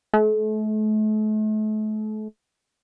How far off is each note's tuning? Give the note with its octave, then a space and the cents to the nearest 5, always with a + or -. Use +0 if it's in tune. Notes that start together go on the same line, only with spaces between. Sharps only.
A3 -40